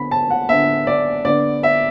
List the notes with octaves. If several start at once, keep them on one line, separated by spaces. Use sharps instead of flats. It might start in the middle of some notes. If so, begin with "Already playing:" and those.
Already playing: D3 B3 B5
A5
F#5
D3 B3 E5
D5
D3 B3 D5
E5